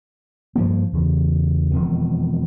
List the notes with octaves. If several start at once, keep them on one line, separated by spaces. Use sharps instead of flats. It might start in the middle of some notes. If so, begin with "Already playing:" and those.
G2 F3 A#3
E2 C#3
E1 F2 D#3